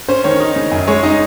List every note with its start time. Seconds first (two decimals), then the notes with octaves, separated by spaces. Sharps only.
0.09 C#4 C5
0.24 D#3 C#5
0.40 D#4
0.56 C#3
0.72 F#2
0.87 G#3 C#5
1.03 D#4 D#5